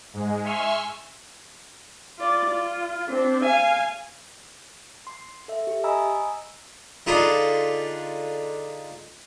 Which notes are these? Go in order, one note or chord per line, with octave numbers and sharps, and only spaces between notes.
G#2 G#3
E5 G#5 C6 C#6 E6 F6
F4 D5
F4
C4 D4
F5 G#5
C6
A4 E5
G4 E5
D#5 G#5 A#5 B5 D#6 E6
D3 D4 D#4 F4 G#4 B5